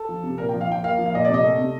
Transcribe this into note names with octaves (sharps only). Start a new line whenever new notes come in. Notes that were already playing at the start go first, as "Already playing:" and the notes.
Already playing: A4
F3
C3
A#2 A#4
F3 G5
F5
F3 G5
A#3 F5
F3
F5
A#2 D#5
C3 D5
D#5
A3
C3